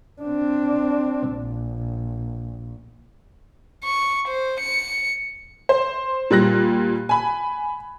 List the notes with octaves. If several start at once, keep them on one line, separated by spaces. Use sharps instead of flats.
C4 D4
A#1
C#6
C5
C#7
C5
A#2 G3 F#6 A#6
G#5 B5